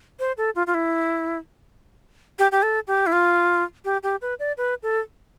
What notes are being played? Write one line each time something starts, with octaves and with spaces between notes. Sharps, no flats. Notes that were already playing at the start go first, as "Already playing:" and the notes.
C5
A4
F4
F4
E4
G4
G4
A4
G4
E4
F4
G4
G4
B4
D5
B4
A4